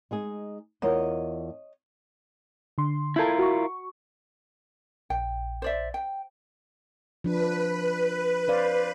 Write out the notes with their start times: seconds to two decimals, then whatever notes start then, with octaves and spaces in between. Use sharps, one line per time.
0.11 G#3 D#4 G#4
0.82 E2 F4 A#4 C#5 D#5
2.78 D3 C6
3.16 E4 F4 A4 A#4 G6 G#6
3.38 F#4 C#6
5.10 A#1 G5
5.62 C5 D5 E5
5.94 G5
7.24 F3 D4 B4
8.48 C5 D5 F5